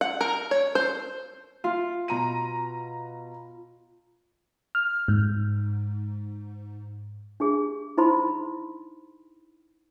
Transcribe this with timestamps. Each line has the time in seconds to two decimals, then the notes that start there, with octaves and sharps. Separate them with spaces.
0.01 F#5
0.21 A#4
0.51 C#5
0.75 C5
1.64 F4
2.08 B2 A#5 D#7
4.75 F6
5.08 G#2
7.40 D4 G4 G#4
7.97 D#4 E4 C5 B5 C6